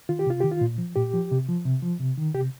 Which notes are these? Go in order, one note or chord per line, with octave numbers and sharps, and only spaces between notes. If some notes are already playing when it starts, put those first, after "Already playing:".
D#3 F4
G4
C3 F4
D#3 G4
F4
A#2
F3
A#2 G4
F3
C3
F3
C3
F3
C3
D#3
C3 G4